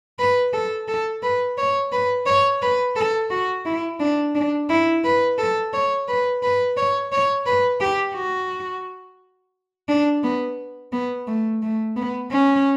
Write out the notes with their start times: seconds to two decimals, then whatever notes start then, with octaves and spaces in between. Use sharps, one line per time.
0.19 B4
0.53 A4
0.88 A4
1.23 B4
1.58 C#5
1.92 B4
2.26 C#5
2.62 B4
2.96 A4
3.31 F#4
3.65 E4
4.00 D4
4.35 D4
4.70 E4
5.04 B4
5.38 A4
5.73 C#5
6.08 B4
6.43 B4
6.77 C#5
7.12 C#5
7.46 B4
7.81 G4
8.15 F#4
9.88 D4
10.24 B3
10.93 B3
11.27 A3
11.63 A3
11.97 B3
12.31 C#4